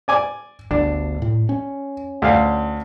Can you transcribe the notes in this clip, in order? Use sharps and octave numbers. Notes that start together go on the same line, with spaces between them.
D5 G#5 D6
G1 D2 D4
A2
C#4
D2 F5